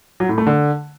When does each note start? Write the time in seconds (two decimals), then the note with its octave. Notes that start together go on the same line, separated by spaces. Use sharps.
0.20 F#3
0.29 A2
0.38 A3
0.47 D3